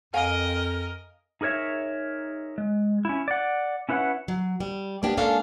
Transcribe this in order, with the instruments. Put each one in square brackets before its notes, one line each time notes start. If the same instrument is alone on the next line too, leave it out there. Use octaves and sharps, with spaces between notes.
[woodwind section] F2 [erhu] A#4 [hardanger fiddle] D#5 [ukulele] F5 G#5
[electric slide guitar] D#4 G#4 A#4 C#5 E5
G#3
C#4 E4
D5 F#5
C#4 E4 B4 C#5 F#5
[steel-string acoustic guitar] F#3
G3
A#3 B3 D4 G4
G#3 A#3 C#4 D4 A4 F5